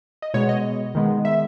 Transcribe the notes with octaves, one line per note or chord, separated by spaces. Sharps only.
D#5
B2 G#3 B3 C#5
D#5
D#3 G#3 B3
E5